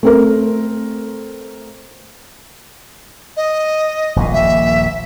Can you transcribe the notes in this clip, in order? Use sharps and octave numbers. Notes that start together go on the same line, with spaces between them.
A3 C4 A#4
D#5
D#1 A#1 A#2
E5